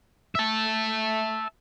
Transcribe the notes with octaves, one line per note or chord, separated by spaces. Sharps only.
E5 A5